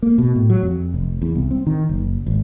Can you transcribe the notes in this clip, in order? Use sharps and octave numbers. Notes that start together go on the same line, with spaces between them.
A#3
B2
A2
F#3
F2
F1
E2
C2
C4
D#3
F#1
G#1